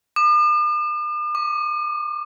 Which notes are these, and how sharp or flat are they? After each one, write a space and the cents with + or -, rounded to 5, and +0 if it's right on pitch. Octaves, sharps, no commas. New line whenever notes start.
D6 +45
D6 -10